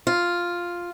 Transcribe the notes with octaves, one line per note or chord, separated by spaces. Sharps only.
F4